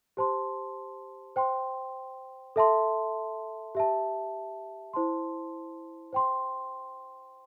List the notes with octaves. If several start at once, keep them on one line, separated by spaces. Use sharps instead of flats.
G4 C5 A5 C6
C5 G5 C6
A4 E5 A5 C6
G4 E5 A5
E4 C5 A5 C6
C5 G5 C6